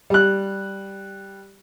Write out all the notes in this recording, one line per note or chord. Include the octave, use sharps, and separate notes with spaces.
G3 F#6